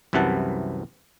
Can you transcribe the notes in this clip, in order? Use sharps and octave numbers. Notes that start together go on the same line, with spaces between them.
C2 F#2 C3 E3 F#5 A5